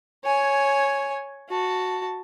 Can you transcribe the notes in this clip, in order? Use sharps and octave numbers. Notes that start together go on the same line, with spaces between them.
C#5 G#5
F#4 A5